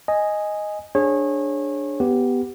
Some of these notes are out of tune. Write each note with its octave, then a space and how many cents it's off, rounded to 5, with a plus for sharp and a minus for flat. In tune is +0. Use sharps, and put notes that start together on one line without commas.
D#5 +0 G#5 +0
D4 +0 G#4 +0 C#5 -30
B3 +0 G4 +0 B4 +0